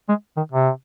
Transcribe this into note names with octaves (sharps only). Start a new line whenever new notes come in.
G#3
D#3
C3